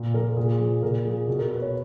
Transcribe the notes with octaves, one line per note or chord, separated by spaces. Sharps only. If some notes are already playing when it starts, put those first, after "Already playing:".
Already playing: A#2
F3 A#4
A#4
A#2 G#4
F3
A#2 A#4
F3 G#4
B2
A#4
B4
C#5